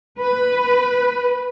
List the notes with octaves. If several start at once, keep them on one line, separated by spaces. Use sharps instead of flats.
B4